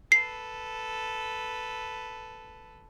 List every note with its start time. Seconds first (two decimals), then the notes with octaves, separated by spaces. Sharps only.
0.12 A4 B4 C7